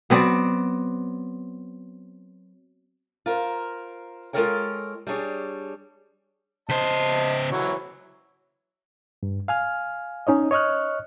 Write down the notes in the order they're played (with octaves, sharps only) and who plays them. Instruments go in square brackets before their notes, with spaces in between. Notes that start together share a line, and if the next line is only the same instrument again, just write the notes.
[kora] F#3 B3 C4 D5
[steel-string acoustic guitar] F4 A#4 C5
G#3 F4 A4 A#4 C#5 G5
G3 D4 G#4 C#5
[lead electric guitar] C#3 C5 [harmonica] D#5 A5
[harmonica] E3 F#3 C#5
[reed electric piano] G2
F5 G#5 F6
C#4 D#4 C#5 D#5
C#5 D#5 C#6 F6 F#6